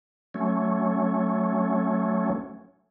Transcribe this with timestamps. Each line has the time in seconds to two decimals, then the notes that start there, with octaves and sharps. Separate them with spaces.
0.34 F#3 A3 C#4